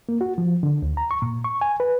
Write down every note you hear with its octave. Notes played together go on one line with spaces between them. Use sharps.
A#3
F#4
F3
D3
D2
A#5
C#6
A#2
C#6
G#5
B4